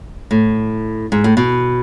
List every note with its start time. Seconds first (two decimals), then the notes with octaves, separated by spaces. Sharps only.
0.31 A2
1.12 G#2
1.24 A2
1.37 B2